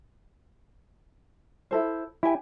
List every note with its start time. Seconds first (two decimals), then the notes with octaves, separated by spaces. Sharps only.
1.71 E4 A4 C5
2.23 E4 G4 G#5